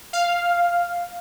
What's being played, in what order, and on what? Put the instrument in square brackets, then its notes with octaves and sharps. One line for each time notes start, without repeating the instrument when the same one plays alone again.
[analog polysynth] F5